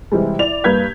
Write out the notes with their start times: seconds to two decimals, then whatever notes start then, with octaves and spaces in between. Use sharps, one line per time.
0.12 C3 E3 G3 G#3
0.39 E4 D5 F7
0.64 G2 A#3 B4 G6 G#6 B6